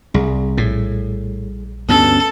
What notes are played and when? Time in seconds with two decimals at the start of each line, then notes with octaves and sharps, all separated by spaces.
0.14 C2 G3 G#4
0.58 A#1 A2
1.89 D2 G2 B3 C#4 A4